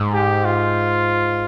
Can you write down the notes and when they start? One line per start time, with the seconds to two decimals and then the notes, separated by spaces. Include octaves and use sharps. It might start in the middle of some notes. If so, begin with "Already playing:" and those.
Already playing: G#2
0.14 G4
0.45 F4